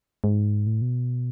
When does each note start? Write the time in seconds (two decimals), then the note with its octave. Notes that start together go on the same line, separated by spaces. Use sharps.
0.24 G#2
0.67 A2
0.82 B2